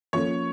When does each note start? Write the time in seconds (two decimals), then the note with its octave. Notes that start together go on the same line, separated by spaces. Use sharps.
0.13 F3 A#3 C#4 F4 A4 C#5